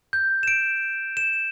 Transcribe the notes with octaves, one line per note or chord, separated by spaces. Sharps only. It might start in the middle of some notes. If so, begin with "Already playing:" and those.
G6
E7
D7
E7